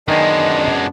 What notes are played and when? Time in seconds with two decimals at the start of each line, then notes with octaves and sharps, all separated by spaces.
0.08 F#2 D#3 G#3 B3 D4 D#5 G#5